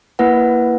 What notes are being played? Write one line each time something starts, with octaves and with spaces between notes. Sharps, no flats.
A#3 E4 B4 F#5